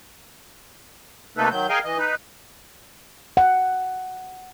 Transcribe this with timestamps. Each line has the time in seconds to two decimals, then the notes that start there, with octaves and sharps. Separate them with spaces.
1.37 C3 A3 A#3 D#4 A4 B4
1.51 D#3 F#3 G6
1.69 G#4 A#4 D#5 F5 G5 G#5
1.85 E3 D#5
1.98 D#4 B4
3.37 F#5